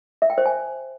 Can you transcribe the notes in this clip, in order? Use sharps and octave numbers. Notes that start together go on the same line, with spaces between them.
E5
G5
C5
G#5